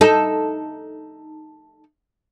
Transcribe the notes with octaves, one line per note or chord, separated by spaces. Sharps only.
D#4 A4